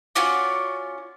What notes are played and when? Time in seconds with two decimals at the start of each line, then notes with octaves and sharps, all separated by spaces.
0.15 C#4 F4 F#4 D5